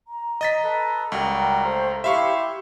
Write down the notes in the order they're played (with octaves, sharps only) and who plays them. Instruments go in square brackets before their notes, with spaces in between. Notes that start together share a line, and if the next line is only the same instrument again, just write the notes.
[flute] A#5
[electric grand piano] D#5 A6 B6
[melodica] A4 B4
[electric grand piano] C#2 [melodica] G3 F#4 A#4
[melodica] A3 A#5 C6 [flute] C5
[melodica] E4 C6 [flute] G4 [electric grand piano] E5 F5 C#6